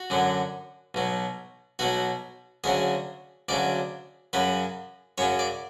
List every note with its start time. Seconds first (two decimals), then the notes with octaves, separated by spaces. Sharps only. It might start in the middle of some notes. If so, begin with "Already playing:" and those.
Already playing: F#4
0.10 F#2 D3 F#3
0.94 B1 B2 F#3
1.79 B1 B2 F#3 F#4
2.64 D2 C#3 F#3 G#4
3.49 D2 C#3 F#3 D5
4.33 F#2 C#3 F#3 B4
5.18 F#2 C#3 F#3 C#5
5.39 D5